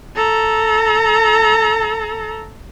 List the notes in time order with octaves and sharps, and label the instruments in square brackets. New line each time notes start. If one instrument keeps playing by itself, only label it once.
[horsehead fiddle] A4 A#5